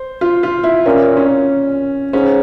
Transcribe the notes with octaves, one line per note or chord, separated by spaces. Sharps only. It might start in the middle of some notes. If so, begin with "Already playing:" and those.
Already playing: C5
F4
F4
E4
A#2 C#4
C#4
G#2 C#4